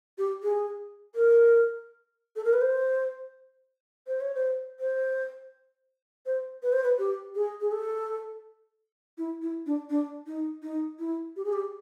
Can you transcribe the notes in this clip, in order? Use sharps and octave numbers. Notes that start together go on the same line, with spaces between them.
G4
G#4
A#4
A4
A#4
B4
C5
C5
C#5
C5
C5
C5
B4
C5
B4
G4
G#4
G#4
A4
E4
E4
D4
D4
D#4
D#4
E4
G4
G#4
G4